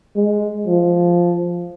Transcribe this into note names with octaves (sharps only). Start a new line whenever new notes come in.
G#3
F3